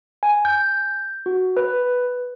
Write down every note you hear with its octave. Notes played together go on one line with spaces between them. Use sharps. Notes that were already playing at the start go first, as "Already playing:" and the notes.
G#5
G6
F#4
B4